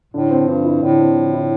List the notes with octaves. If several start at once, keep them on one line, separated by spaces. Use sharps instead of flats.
A2 D3
C4
G2 F3
E4
A2 D3
C4
F3
E4